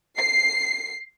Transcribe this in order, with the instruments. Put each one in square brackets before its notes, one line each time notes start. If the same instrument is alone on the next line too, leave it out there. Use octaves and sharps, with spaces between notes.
[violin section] C7